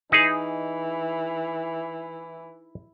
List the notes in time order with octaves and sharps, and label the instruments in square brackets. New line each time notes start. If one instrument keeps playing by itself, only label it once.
[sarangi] E3 [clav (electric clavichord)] D#4 G#4